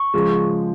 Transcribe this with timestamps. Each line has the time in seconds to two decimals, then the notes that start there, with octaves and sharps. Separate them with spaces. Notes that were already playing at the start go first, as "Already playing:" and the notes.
Already playing: C#6
0.14 C#3 F3 G#3